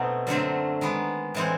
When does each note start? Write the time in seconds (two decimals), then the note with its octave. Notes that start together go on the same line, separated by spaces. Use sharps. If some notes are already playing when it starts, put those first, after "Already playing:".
Already playing: B2 F#3 A3 C4 D#4
0.27 F#2 D3 F#3 A3 C4
0.81 D#3 G#3 B3
1.35 A2 E3 G#3 C4